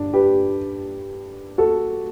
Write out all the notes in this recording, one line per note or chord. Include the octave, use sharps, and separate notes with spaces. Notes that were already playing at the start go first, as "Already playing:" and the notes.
Already playing: G2 D3 D4
G4 B4
F#4 A4